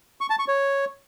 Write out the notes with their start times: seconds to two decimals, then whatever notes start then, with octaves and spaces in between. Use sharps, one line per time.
0.21 C#6
0.30 A5
0.39 C#6
0.48 C#5